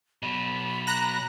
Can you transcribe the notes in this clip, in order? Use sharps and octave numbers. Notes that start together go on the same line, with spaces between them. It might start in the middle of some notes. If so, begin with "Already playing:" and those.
B2 F#3 B5
A#5 F#6 A#6